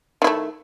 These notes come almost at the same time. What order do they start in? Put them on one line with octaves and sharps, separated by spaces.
D#3 E4 A3